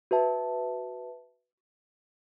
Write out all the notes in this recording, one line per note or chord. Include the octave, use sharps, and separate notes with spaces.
F#4 B4 E5 A5